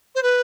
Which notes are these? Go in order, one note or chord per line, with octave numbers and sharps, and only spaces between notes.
C5
B4